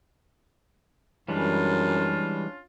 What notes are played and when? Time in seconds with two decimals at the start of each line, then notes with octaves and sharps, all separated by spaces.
1.28 F#2 E3 G3 G#3 C#4 D4 F4